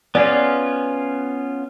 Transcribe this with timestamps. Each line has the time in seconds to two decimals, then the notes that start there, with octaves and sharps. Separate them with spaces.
0.15 B3 C#4 F4 G#4 D5